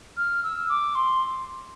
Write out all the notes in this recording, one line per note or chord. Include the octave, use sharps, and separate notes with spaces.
F6
E6
D6
C6